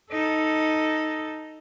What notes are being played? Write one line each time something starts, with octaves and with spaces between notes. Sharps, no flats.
D#4 A4